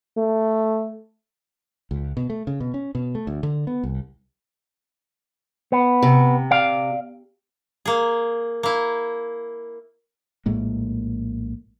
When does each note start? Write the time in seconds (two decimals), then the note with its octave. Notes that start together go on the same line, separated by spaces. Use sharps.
0.17 A3
1.91 C#2
2.17 B2
2.30 A3
2.47 C#3
2.60 B2
2.74 C#4
2.95 B2
3.15 A3
3.27 D2
3.43 D3
3.67 B3
3.84 C2
5.72 B3
6.02 C3
6.51 D5 F5
7.85 A#3 G#4
8.63 A#3 E4
10.46 A#1 A2 G#3 A#3